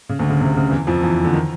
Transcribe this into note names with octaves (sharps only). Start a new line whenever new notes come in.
C#3
D2 D3
C#3
C3
C#3
E2 E3
F2 F3
E2 E3
D3
D#3